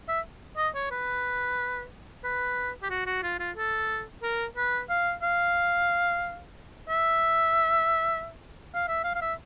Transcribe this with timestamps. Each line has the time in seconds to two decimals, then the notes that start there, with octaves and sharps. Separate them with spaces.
0.08 E5
0.57 D#5
0.75 C#5
0.91 B4
2.24 B4
2.83 G4
2.90 F#4
3.06 F#4
3.23 F4
3.39 F4
3.56 A4
4.22 A#4
4.57 B4
4.89 F5
5.23 F5
6.89 E5
8.74 F5
8.88 E5
9.04 F5
9.15 F5
9.21 E5